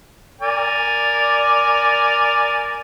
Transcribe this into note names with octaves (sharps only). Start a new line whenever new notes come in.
A#4 D5 G#5